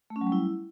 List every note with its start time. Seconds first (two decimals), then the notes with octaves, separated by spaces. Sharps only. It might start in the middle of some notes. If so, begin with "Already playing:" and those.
0.10 A3
0.16 C#4
0.21 F#3
0.27 G3
0.32 E4